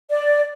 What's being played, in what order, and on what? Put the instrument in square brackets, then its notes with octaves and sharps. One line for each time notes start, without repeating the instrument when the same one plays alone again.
[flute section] D5